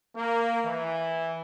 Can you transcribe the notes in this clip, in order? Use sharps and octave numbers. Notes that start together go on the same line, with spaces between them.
A#3
E3